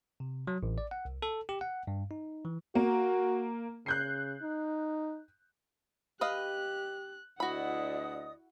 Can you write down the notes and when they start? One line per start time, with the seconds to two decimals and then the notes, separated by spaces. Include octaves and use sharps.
0.20 C3
0.47 F#3
0.63 A1
0.78 D5
0.91 F#5
1.05 C2
1.22 A4
1.49 G4
1.61 F#5
1.87 G2
2.11 D#4
2.45 E3
2.75 A#3 F#4
3.86 C#3 F#6 G6 C7
4.42 D#4
6.21 G4 B4 D#5 F5 F#6
7.40 D2 E4 F#4 D5 D#5 F#5 B5 D#6